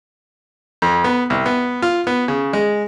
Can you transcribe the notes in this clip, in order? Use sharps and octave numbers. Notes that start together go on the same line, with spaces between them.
F2
B3
C2
B3
F4
B3
C#3
G#3